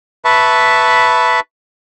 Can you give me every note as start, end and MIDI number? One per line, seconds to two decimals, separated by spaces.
0.25 1.40 71
0.25 1.40 76
0.25 1.40 81
0.25 1.40 83
0.25 1.40 85